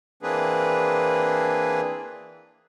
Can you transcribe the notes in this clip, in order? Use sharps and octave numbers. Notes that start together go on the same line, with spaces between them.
E3 A#3 C4 D4 G#4 B4